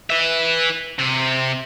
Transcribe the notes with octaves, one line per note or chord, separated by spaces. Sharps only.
B4 E5
C3